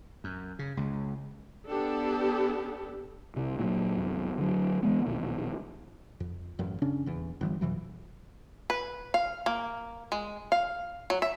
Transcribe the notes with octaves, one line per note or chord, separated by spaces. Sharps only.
F#2
C#3
C#2
B3 D4 G4 A4
C2 C3
A#2 F3 F#3
C2 F#2
D3 F#3
E3 G#3 B3
A#1 D#2 B2
F2
A1 F#2
C#3 C#4 D4
D#1 E2
G1 E3 G3
F2 B2 E3 F#3
B4
F5
A#3
G#3
F5
F#3
E5